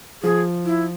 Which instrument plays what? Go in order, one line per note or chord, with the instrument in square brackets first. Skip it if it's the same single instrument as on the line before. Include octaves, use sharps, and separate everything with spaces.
[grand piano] F3 [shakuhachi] G#4
[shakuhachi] E4